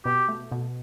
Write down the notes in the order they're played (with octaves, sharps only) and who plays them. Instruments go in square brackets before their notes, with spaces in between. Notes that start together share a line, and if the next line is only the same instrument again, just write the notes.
[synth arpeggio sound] B2 [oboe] G4
[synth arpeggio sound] A3
B2